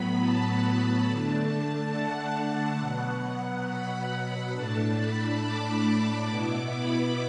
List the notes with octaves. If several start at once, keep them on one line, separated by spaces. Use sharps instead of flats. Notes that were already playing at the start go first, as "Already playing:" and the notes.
Already playing: A2 F#3 B3 B5
A5
D3 A3 D4
F#5
B2 F#3 B3
B5
B5
A2 A3 D4 A5
B5
D6
B5
B2 B3 E4 D6
B5